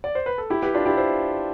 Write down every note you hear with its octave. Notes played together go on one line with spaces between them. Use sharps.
D5
C5
B4
A4
E4 G4
G4 B4
D4 F4
E4 G4
C5 E5